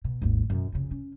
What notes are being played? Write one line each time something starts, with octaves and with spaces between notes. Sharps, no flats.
B2
G#1 D#2
F#2 B2
F2 C#3
C#4